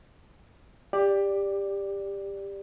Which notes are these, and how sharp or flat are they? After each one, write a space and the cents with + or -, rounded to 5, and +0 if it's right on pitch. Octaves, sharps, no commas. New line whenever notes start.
G4 +15 D5 +0